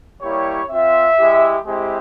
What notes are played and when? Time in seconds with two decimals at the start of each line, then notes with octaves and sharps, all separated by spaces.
0.22 G3 A#3 E4 G4 C#5
0.70 C4 F4 E5
1.18 G#3 E4 G4
1.67 G#3 C4 E4 G4